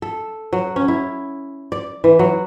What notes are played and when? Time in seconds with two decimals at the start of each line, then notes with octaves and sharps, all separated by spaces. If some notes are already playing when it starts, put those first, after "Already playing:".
0.02 A4
0.53 F#3
0.76 C#4
0.88 E4
1.72 D5
2.04 E3
2.19 F#3